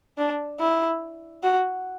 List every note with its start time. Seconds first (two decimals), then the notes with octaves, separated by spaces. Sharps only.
0.18 D4
0.60 E4
1.43 F#4